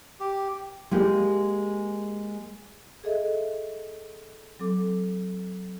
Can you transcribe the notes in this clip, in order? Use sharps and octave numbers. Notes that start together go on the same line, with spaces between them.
G4
G#3 A#3 G4
G#4 A4 D#5 E5
F#3 C4 A4 D6